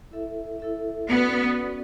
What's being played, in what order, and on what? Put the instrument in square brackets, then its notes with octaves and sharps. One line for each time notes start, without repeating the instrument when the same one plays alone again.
[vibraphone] E4 A4 E5
E4 A4 E5
[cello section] B3 [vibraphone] C#4 F#4 B4 D5